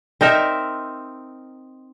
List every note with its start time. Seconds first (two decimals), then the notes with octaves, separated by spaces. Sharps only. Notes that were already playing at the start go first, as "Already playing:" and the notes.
0.21 C4 D#4 A#4 E5